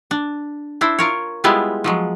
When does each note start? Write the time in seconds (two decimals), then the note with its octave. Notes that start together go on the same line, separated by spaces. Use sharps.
0.11 D4
0.81 D4 E4 C5
0.99 F4 A#4 C#5
1.44 G3 G#3 B3 E4 F4 G4
1.84 F3 F#3 G#3